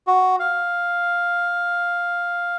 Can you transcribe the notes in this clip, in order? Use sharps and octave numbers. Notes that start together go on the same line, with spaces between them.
F#4
F5